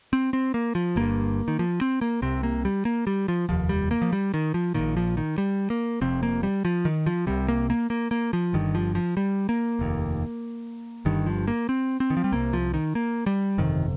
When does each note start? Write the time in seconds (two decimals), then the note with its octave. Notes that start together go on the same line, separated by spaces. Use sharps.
0.13 C4
0.33 C4
0.54 A#3
0.75 F3
0.96 G1 G2 A#3
1.48 D#3
1.59 F3
1.81 C4
2.01 A#3
2.22 C2 C3 C4
2.43 A#3
2.65 G3
2.85 A#3
3.07 G3
3.28 F3
3.49 F1 D#2 F3
3.69 G3
3.91 A#3
4.02 F3
4.13 G3
4.34 D#3
4.54 F3
4.74 A#1 A#2 D#3
4.97 F3
5.17 D#3
5.38 G3
5.70 A#3
6.01 F1 F2 C3 C4
6.23 A#3
6.43 G3
6.65 F3
6.85 D#3
7.06 F3
7.27 C2 C3 G3
7.48 A#3
7.70 A#3
7.90 A#3
8.11 A#3
8.33 F3
8.53 G1 G2 D#3
8.75 F3
8.95 F3
9.17 G3
9.49 A#3
9.79 F1 D#2
11.05 G1 G2 D#3
11.27 F3
11.48 A#3
11.69 C4
12.00 C4
12.10 D#3
12.17 F3
12.24 G3
12.32 C2 C3 A#3
12.53 F3
12.74 D#3
12.95 A#3
13.26 G3
13.58 G1 F2 C3 D#3